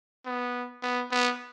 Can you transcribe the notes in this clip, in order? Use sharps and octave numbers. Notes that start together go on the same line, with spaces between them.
B3
B3
B3